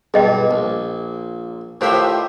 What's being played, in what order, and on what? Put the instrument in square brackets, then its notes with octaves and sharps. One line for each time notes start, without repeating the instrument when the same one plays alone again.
[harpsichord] B1 G2 [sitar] A#2 [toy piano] G#4 D#5 G5
[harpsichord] A#1
[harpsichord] A2 D#3 E5 [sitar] F4 G4 C5